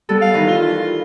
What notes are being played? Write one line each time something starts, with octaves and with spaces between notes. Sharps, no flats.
G3 B3 A4
F5
D#3 E3 B4
F4
F4